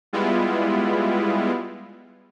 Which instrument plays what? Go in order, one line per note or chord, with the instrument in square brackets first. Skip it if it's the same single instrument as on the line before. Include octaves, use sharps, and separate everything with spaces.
[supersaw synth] G3 G#3 B3 E4 F4